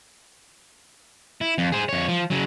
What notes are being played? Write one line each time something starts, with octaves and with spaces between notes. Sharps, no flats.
E4
F2
G#4 C5
F2 C#5
F3
C#3 F#3